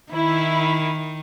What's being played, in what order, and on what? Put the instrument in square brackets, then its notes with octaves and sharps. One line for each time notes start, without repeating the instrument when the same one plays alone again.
[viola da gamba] D#3 [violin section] E4